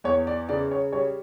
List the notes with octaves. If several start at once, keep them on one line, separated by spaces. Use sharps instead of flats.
E2 C#5
D5
C#3 D5
C#5
G3 C#5